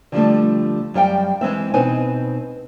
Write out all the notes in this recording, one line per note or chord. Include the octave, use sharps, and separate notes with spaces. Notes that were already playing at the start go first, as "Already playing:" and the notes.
D3 F3 G3 A3
F#2 G3 F5 G5
E3 G#3 C4 E5
B2 C4 D#4 B4 G#5